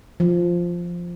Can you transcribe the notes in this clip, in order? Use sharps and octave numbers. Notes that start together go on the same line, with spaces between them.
F3